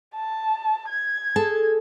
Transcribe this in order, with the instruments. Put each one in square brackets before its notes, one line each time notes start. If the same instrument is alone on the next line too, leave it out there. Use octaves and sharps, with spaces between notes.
[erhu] A5
G#6
[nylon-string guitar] G#4 A4 A5